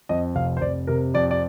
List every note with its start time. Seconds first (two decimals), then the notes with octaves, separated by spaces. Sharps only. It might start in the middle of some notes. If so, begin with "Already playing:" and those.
0.09 F2 D#5
0.35 F1 F5
0.57 C5
0.61 F1 D5
0.87 C3 A#4
1.14 F2 D5
1.31 D5